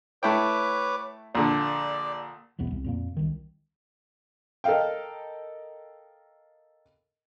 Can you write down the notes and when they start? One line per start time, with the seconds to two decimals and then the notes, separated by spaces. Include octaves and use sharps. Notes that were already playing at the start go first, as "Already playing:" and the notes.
0.23 A3 E4 B4 C#5 G5 D6
1.35 A#1 D3 D5
2.59 E1 B1 E2 B3
2.71 C2
2.84 F2 A#2 A#3
3.17 C2 D#3
4.64 A4 A#4 D#5 F5 G5